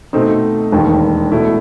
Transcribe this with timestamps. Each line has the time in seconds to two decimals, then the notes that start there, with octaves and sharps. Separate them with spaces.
0.13 B2 A3 C4 D#4
0.72 E1 D#2 D#3
1.32 B2 A3 E4